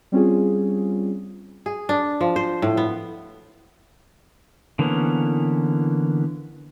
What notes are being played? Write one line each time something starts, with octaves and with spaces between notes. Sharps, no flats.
G3 C4 C#4 F4 G#4
G#4
D4
F3
C5
A2
B3
D3 E3 A#3 B3 C#4